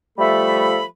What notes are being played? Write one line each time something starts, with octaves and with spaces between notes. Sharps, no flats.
F3 G3 A3 A4 E5 B5